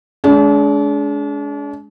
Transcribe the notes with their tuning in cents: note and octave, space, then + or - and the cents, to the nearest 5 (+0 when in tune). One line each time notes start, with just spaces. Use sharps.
G#3 +20 D4 -40